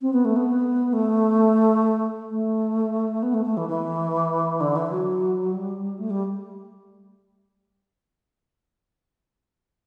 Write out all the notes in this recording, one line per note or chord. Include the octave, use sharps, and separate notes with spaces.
C4
B3
A3
B3
A3
A3
B3
A3
A3
E3
E3
D3
E3
F#3
G3
A3
G3